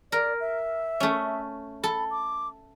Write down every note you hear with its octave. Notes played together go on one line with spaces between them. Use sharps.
A#4 D5
E5
A3 C#4
A4 B5
D6